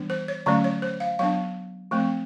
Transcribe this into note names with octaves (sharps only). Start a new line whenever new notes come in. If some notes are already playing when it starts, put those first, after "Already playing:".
Already playing: E3 G3 B3 D4
C5
C#5
D3 F#3 A3 C#4 D5
C#5
C5
F5
F#3 B3 D4 F5
F3 A3 C4